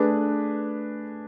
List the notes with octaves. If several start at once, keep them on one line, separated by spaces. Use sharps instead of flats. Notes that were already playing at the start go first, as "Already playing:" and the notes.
Already playing: A3 D4 G#4 B4